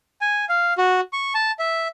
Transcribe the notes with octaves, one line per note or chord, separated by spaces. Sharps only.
G#5
F5
F#4
C#6
A5
E5